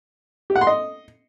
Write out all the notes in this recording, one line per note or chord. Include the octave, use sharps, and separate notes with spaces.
G4
F#5
C6
D#5